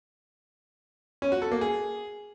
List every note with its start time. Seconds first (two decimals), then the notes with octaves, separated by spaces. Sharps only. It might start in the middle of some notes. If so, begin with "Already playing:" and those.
1.22 C#4
1.32 F#4
1.42 A4
1.52 A#3
1.61 G#4